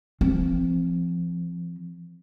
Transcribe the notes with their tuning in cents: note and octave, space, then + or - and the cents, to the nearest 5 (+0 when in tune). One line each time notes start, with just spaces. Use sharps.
F3 -30 C4 +0